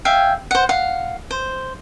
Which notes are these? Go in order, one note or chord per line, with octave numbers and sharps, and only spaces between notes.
E5 F5 G5 G#5
C5 F#5
F5 F#5
C5